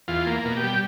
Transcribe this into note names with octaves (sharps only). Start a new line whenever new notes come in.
E2 F4
A#3
B2
G4
G3